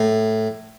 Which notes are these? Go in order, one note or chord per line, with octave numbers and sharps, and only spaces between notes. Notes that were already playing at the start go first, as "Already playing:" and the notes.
Already playing: A2